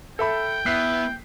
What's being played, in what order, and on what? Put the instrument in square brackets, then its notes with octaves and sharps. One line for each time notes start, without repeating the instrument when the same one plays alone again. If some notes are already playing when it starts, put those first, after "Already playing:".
[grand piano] A4 E5 B5 [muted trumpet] G5
[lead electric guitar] B3 [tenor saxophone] E4 [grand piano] F#6 B6 C7